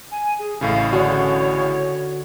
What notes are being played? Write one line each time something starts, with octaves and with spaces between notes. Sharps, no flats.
G#5
G#4
A1 A2 C#3 F5
D3 F#4 C#5